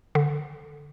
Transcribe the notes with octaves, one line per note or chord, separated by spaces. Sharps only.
D3